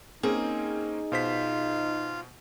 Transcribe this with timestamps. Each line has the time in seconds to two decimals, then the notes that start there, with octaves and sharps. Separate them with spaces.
0.23 A#3 C4 C#4 D#4 G#4
1.12 B2 F4 C5 F5 B6